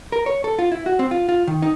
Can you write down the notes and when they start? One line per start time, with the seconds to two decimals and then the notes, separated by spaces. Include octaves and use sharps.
0.12 A#4
0.26 C#5
0.44 A4
0.59 F4
0.72 E4
0.86 F#4
0.99 C4
1.11 F4
1.29 F4
1.47 D#3
1.62 D#4